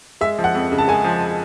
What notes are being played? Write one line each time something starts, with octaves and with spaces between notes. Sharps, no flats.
G#3 E5
F3
F#5
F2
C#3
A5
G#3 G#5
F3